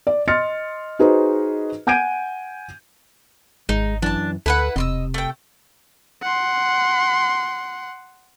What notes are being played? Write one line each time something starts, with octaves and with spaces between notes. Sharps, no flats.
D5
D#5 C6 F6 A6 C#7
D#4 F#4 G#4 B4 C5 D#5
F#5 G#5 G6 G#6 D7 D#7
G#1 G#3 D#4
F#2 E3 D4 A5
D2 E4 A4 B4 F#5
E1 C3 D#5 C6 E6
A3 G5
F#5 C6